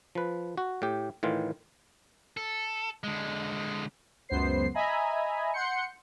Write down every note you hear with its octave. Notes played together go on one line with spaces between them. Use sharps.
F3 B4
F#4
A2 G4
A2 D#3 E3 F4
A4
D3 G#3
C#2 F#2 B3 C5 C7
D#5 E5 G#5 A#5 B5
F#5 C6 G6 C#7